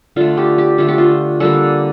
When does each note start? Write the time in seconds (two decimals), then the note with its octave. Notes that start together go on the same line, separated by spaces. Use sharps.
0.16 D3 A3 F4
0.37 G4
0.58 G4
0.78 D3 A3 F4
0.88 G4
0.98 F4
1.40 D3 G3 A#3 A4